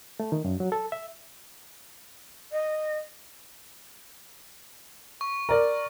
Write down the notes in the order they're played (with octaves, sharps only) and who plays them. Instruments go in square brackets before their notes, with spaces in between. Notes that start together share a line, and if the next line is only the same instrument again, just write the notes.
[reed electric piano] A3
D#3
F#2
F#3
A4
E5
[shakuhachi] D#5
[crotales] C#6
[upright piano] A#4 D5